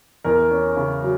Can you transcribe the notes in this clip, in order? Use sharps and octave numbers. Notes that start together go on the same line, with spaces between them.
E2 A#4
C#4
C#3
F#3